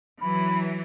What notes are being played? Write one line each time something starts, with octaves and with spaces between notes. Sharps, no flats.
E3 F#3 B5